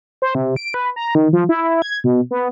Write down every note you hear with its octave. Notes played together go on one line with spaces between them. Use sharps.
C5
C3
D7
B4
A#5
D#3
F3
E4
G#6
B2
B3